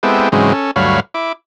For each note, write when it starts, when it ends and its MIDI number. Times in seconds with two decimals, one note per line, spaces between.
0.03 0.29 56
0.03 0.29 59
0.03 0.29 60
0.03 0.29 64
0.03 0.29 67
0.03 0.29 69
0.32 0.53 44
0.32 0.53 49
0.32 0.53 52
0.32 0.53 54
0.32 0.53 56
0.32 0.53 60
0.53 0.71 61
0.53 0.71 69
0.76 1.00 38
0.76 1.00 43
0.76 1.00 54
0.76 1.00 73
0.76 1.00 77
0.76 1.00 83
1.14 1.32 64
1.14 1.32 86